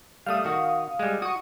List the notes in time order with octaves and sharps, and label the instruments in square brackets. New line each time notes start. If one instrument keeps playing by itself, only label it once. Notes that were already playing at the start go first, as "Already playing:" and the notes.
[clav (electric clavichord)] G3 A3 [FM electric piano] F5 D#6
[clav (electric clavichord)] D#3 F#4
G3 G#3
[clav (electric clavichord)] F#4 [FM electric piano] C#6 D#6